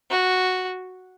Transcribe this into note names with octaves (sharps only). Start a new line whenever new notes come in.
F#4